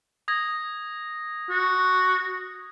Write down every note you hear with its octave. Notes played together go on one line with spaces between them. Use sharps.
D#6 G#6 A#6
F#4